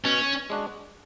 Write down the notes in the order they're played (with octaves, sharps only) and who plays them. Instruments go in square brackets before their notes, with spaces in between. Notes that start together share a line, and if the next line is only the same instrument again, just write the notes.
[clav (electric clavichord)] B2 [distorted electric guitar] C#4
[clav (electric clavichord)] G#3 D4 F#4